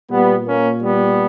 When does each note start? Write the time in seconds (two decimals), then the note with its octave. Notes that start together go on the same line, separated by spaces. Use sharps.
0.11 A#2 G3 B3
0.46 A#3 C#4
0.82 G3 B3